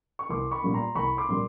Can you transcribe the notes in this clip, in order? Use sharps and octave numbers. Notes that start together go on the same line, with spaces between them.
C#6
C2 C6 D6
B5 C#6
A#2 G3 A#3
A#5 C6
C2 B5 C#6
C6 D6
A#2 G3 A#3 C6